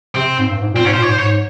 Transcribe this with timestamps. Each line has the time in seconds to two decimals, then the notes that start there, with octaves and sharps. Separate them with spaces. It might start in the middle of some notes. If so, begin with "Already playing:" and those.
0.15 C3 C4
0.38 G#2
0.50 G2
0.61 G#2
0.74 A#2
0.76 C4
0.85 G#2 C#4
0.94 A#2 C5
1.02 C#5
1.08 G#2
1.11 C5
1.19 G#2 C#5